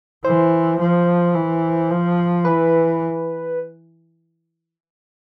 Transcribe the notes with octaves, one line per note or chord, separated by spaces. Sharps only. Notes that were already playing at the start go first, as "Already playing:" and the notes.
E3 C5
F3
E3
F3
E3 B4